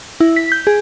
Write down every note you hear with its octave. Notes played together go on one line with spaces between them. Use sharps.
E4
B6
G6
G#4